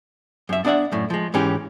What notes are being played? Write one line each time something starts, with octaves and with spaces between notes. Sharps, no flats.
F#2 E5
B3 D4 D5 E5 F#5
F#2 A2
F3 G#3
G#2 E3 C#4 G4